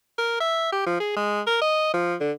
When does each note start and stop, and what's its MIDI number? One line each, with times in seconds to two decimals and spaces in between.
0.18 0.38 70
0.40 0.68 76
0.72 0.81 67
0.86 0.98 53
1.00 1.15 68
1.16 1.41 56
1.47 1.57 70
1.62 1.93 75
1.94 2.15 53
2.21 2.32 50